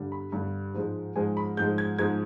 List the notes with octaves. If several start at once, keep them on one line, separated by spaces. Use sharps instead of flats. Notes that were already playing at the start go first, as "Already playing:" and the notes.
Already playing: G2 D3 G3
B5
G2 D3 G3
G#2 F3 G#3
G#2 F3 G#3 G#5
B5
G#2 F3 G#3 G6
G#6
G#2 F3 G#3 G#6